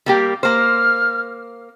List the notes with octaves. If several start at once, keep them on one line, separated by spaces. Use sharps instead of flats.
G3 A#3 G4
A#3 C5 F6